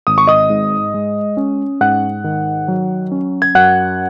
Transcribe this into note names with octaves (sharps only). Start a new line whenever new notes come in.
G#1 D#6
C#6
D#5 D#6
G#2
G#3
C#4
G#2 F#5 F#6
D#3
F#3
C#4
G#6
F#2 F#5 F#6